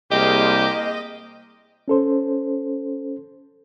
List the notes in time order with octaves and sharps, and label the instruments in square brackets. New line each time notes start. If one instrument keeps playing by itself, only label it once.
[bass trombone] C2 [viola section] A#3 G#4 C5 [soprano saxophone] G4 [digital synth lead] D#5
[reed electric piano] C#4 A4 C5